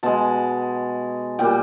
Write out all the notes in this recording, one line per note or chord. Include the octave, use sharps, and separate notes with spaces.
B2 G#3 A5
A#2 G3 G5